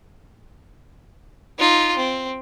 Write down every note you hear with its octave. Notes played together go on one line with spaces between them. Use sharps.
D#4 F4
C4